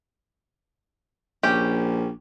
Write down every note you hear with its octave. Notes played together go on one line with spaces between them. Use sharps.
A#1 C#4 G4